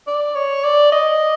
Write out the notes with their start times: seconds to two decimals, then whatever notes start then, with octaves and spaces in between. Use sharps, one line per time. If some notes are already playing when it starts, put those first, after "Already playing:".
0.07 D5
0.36 C#5
0.64 D5
0.92 D#5